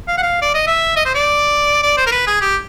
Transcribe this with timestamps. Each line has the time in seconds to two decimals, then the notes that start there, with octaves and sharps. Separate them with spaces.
0.08 F5
0.18 F#5
0.23 F5
0.42 D5
0.55 D#5
0.67 E5
0.96 D#5
1.05 C5
1.15 D5
1.83 D5
1.97 C5
2.07 A#4
2.12 B4
2.27 G#4
2.41 G4